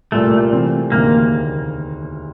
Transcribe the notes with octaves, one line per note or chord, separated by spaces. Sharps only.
C2 A#2 G3 A3 A#3
C3 E3 A3 C4
E1 D2 C3 D#3 A#3